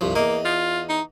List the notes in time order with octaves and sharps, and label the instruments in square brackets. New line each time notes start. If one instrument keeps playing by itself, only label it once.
[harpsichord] C2 G2 F3
[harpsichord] E2 D#5 [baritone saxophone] A#3
[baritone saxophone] F4
D#4